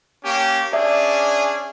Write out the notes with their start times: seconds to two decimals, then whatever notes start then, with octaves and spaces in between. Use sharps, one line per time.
0.25 A#3 C#4 G4
0.73 C#4 D4 G#4 D5 E5